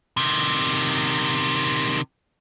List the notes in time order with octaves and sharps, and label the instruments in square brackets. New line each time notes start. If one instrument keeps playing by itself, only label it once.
[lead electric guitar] C3 D#3